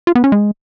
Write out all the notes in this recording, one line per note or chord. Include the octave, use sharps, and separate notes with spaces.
F4
B3
C#4
G#3